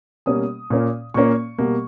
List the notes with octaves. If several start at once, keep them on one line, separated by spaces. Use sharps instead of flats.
B2 G3 A#3 C#4 D#6
A#2 A#3 C#4
A#2 A#3 C#4 C#6
B2 G3 A#3